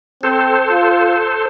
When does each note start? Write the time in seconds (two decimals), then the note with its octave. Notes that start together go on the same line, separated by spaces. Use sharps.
0.23 C4 A4 C5
0.71 F4